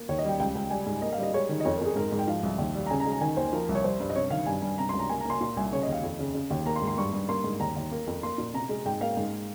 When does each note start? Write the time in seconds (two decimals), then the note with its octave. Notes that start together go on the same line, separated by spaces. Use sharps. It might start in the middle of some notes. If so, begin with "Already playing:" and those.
Already playing: A#3
0.09 D#2 C#5
0.18 D#5
0.25 G3 G5
0.40 C#2 G5
0.55 C#2
0.71 G3 G#5
0.86 G#2
1.02 A#3 D#5
1.13 F5
1.18 G3 D#5
1.33 G#3 C#5
1.49 D#3
1.60 D#5
1.65 F2 C#5
1.76 A#4
1.81 F2 G#4
1.96 G#2 A#4
2.12 G#2
2.19 G5
2.28 F3 F5
2.43 C2
2.58 D#2
2.75 G3
2.86 A#5
2.90 C#3 G#5
3.00 A#5
3.05 G#3
3.12 A#5
3.21 D#3 G#5
3.37 D#2 C5
3.53 F3 A#4
3.69 C2
3.75 C#5
3.84 G3 C5
4.00 G2
4.10 D#5
4.15 C3 C#5
4.31 D#3 F5
4.46 G2 G#5
4.62 G2
4.78 C3 A#5
4.89 C#2 C6
4.99 A#5
5.09 A#3 G#5
5.20 A#5
5.25 A#3 C6
5.41 A#2 C6
5.57 C2 G#5
5.72 C#3 C#5
5.83 D#5
5.88 D#2 F5
6.03 F2
6.19 C#3
6.34 C#3
6.50 D#2
6.66 A#3 A#5
6.76 C6
6.82 G#2
6.87 C6
6.97 G2 C#6
7.13 G2
7.29 A#3 C6
7.44 G#2
7.60 D#2 A#5
7.76 D#2
7.92 A#3
8.07 F2
8.23 A#3 C6
8.38 A#2
8.54 C3 A#5
8.69 G#3
8.86 G#2 G5
9.01 A#3 F5
9.17 G#2